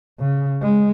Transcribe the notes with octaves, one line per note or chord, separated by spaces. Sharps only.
C#3
G#3